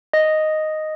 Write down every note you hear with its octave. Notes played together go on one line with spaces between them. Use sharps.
D#5